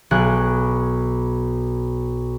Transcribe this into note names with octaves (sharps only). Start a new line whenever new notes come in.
B1 G#4 F#6 D7